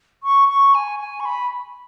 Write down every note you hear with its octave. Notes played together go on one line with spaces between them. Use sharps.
C#6
C#6
G#5
G#5
C#6
B5